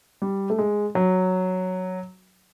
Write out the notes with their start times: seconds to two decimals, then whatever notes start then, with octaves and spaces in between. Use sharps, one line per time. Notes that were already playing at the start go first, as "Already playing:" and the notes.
0.22 G3
0.50 A3
0.58 G#3
0.95 F#3